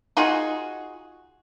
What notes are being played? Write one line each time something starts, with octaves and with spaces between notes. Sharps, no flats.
D#4 F4 F#4 G#4